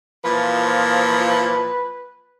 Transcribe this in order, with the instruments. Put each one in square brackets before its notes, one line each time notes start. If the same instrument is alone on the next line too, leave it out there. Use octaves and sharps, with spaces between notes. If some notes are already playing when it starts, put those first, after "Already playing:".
[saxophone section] A#2 E3 F3 [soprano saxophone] B4